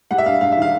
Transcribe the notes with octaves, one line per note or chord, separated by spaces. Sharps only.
G3 F#5
E5
G2 F5
G2 F5
E5
D#3
F5